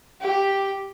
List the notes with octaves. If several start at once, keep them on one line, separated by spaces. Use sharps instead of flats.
G4